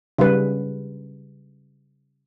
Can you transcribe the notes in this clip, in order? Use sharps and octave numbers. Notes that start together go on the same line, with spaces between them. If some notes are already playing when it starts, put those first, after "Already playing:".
C#3 G3 B4